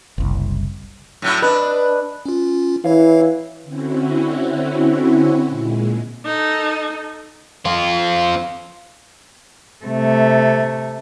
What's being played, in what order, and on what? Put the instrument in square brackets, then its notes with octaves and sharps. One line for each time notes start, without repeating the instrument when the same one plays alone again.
[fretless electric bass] F#1 C2
[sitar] A2 F#3 E4
[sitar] D4 [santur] B4 D#5 B5
[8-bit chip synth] C#4 F4
[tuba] E3 [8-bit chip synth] E4 C#5 F5
[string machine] D3 C4 C#4 E4 F#4
A#2 G#3
[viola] D#4 A4
[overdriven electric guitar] C4 F4
[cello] C3 A3